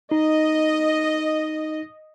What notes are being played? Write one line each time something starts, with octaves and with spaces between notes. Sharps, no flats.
D#4 D#5